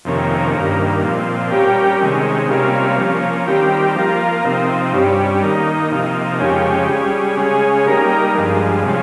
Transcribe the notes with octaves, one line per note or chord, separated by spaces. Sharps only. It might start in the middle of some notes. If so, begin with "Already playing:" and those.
F2 C3 D#3 A#3 C#4
G2 D#3 A#3
A#2 F3 C4
G3 C#4 G4 A#4
C3 D#3 G#3 C#4
C3 G3 A#3 C#4 F4
F3 A#3 C#4
D#3 G3 C4 G4 A#4
F3 A#3 F4 A#4
C3 F3 C4 D#4
G2 G3 C#4
D#3 A#3 D#4
C3 F3 A#3 D#4
F2 C#3 G#3 C#4 G4
G3 C#4 G#4
C#3 G#3 C#4 G#4
G3 A#3 D#4 A#4
G2 F3 G#3
C3 F3 G#3 C#4